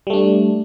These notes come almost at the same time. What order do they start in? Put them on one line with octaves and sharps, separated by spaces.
G3 A3 D4